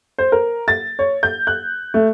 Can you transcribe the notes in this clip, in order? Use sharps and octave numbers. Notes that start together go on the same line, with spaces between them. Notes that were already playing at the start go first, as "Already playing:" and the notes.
C5
A#4
A6
C#5
G6
F#6
A3